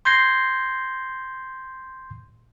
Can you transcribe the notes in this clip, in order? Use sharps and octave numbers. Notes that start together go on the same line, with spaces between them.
C6 G6 G#6 A#6 C7